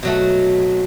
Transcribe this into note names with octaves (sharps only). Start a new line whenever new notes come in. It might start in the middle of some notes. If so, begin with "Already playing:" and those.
B2 F#3 A3